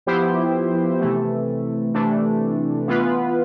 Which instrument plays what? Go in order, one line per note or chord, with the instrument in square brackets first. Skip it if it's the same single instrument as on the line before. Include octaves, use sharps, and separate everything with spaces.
[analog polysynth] F3 B3 E4 G4 C5
C3 E3 A3
C3 E3 A3 D4
E3 B3 F4 B4